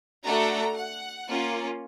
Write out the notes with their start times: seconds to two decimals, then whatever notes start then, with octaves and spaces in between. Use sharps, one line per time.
0.23 A3 D4 F#4 A4 A#5
0.75 F#5
1.28 A#3 C#4 F4